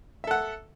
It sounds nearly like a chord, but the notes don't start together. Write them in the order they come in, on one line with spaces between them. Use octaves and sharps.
E5 A4 F#5